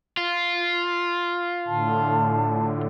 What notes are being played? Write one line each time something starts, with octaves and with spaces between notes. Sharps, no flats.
F4
A2 D3 A5